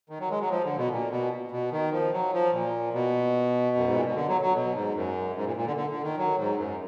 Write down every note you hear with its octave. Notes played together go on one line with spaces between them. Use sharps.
D#3
F#3
G#3
F#3
F3
D3
B2
A#2
B2
B2
D#3
F3
F#3
F3
A#2
B2
F#2
G#2
A#2
B2
D3
F#3
F#3
B2
G#2
F#2
G#2
A#2
A#2
D3
D3
D3
D#3
F#3
G#2
F#2